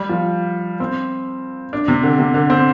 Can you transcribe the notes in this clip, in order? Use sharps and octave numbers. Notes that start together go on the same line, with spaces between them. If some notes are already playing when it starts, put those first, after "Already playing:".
Already playing: G3
F3
C4
D4
C3
D3
C3
D3
C4